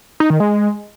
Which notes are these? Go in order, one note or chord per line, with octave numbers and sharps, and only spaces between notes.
D#4
D#3
G#3